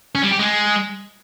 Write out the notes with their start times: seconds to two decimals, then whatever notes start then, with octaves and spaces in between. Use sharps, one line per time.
0.15 C#4
0.23 G3
0.31 G4
0.39 G#3